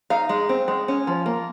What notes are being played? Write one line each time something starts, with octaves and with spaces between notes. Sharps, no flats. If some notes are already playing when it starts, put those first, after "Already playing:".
D#4 F5
G#3
C4
G#3
C#4
F3
A#3